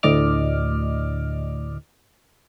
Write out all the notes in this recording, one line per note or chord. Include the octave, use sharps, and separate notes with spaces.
D2 A2 D5 D#5 D6 F6